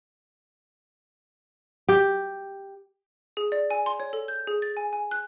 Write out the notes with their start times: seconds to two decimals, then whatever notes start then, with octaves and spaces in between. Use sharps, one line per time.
1.89 G4
3.37 G#4
3.52 D5
3.71 G#5
3.86 C6
4.00 C#5
4.13 A4
4.28 G6
4.47 G#4
4.62 A6
4.77 G#5
4.93 G#5
5.11 F#6